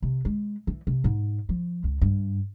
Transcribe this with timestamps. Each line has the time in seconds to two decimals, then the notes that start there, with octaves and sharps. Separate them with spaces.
0.02 C3
0.25 G#3
0.67 E3
0.87 C3
1.04 G#2
1.49 F3
1.84 C#2
2.01 G2